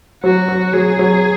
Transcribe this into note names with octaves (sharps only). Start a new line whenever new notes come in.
F#3 F#4
F#3
F#3 G#4
F#3